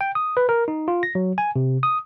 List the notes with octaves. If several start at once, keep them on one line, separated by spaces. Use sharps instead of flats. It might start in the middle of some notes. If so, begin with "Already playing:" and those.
G5
D#6
B4
A#4
D#4
F4
A#6
F#3
G#5
C3
D#6